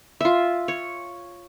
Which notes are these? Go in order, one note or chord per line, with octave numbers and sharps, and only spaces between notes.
F4 E5
C#5